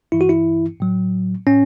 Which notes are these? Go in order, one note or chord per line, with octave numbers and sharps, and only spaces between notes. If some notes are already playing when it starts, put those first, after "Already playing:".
G2 E3 E4
F#4
E4
A2 F#3
A2 C#4